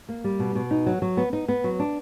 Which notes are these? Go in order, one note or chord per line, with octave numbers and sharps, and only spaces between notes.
A#3
G3
B2
B2
D#4
F#3
F#3
B3
D#4
B3
F#3
D4